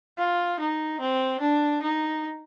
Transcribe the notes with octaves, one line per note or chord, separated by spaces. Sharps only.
F4
D#4
C4
D4
D#4